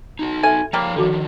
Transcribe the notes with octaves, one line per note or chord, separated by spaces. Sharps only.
D#4 F#4
A4 E5 G#5
F3 G3 A#3 C#5 F5
D3 D#3 F3 F#4 A4